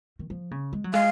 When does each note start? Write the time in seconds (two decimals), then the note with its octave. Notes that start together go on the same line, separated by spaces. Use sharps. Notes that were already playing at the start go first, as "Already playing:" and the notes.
0.19 D#3
0.30 F3
0.51 C#3
0.73 G#3
0.84 F#3
0.93 G#3 F5